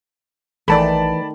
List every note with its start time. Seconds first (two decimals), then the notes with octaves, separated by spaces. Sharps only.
0.68 A#1 D#3 E3 A3 D5 A5 B5